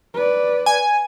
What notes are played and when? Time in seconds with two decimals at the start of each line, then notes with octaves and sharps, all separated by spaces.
0.14 B4 D5
0.66 G#5